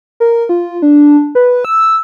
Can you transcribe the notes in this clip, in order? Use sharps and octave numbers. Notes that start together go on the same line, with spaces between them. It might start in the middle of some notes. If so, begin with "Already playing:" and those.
A#4
F4
D4
B4
E6